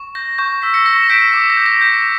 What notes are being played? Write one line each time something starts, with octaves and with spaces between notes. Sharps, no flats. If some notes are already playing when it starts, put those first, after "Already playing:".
Already playing: C#6
G6 A#6
C#6 G6
E6 B6
A#6 C#7
C#6 A#6 C#7
E7
G6 B6 D7
D6 B6
A#6
G6
A#6
G6 B6